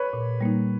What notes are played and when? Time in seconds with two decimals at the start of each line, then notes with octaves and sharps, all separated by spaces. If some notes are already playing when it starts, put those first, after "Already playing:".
Already playing: B4 C#5
0.13 A#2
0.41 G3 A#3 D#4